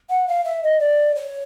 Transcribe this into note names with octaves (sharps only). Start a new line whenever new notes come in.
F#5
F5
E5
D#5
D5
C#5